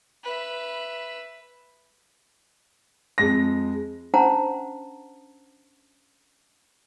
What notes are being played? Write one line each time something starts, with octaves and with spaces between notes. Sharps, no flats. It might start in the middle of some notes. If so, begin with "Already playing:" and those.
B4 E5
F2 G#3 A#6
C#4 D4 C5 F#5 A5 A#5